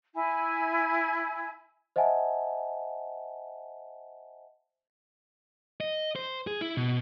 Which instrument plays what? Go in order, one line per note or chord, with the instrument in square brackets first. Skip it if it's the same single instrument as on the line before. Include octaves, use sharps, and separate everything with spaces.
[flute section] E4 G#5
[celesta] C5 D#5 E5 F#5 G#5 A5
[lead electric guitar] D#5
C5
G#4
E4
B2